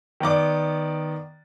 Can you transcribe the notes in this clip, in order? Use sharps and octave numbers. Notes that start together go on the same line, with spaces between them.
D#3 B3 D5 D6